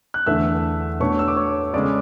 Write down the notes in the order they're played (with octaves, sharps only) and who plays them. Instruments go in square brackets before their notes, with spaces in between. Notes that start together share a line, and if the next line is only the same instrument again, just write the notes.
[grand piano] F#6
E2 D3 A3 D4 E5 E6
B2 A3 D4 C#5 C#6
E6
D6
C#5 C#6
C#3 G#3 C#4 D5 D6